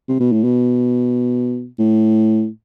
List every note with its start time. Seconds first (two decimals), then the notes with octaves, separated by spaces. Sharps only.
0.09 C3
0.20 B2
0.32 A2
0.45 B2
1.79 A2